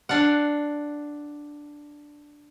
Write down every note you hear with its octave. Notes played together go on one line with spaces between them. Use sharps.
D4 F5 F#5